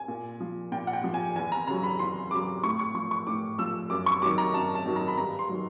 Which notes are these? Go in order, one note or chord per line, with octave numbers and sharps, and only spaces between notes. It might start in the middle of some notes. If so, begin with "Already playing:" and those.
Already playing: G#5
A#2
F3
A#2 G5
F#5
G5
F3
G#5
E2 G#5
A#5
C#3 F#3 A#5
B5
E2 C6
C#3 F#3 D6
A2 C#6
C#6
F3 C#6
C#6
A2 D6
F3 E6
F#2 D6
C#6
D#3 F#3 D6
A#5
F#2 A5
A5
D#3 F#3
A#5
B5
G2 A#5
C6
D#3 F#3